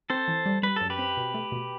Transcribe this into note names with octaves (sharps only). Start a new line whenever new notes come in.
C4 A4 C5
E3
G3
G3 B4
F#2 A4
G4 B4
C4
B2
A3
B2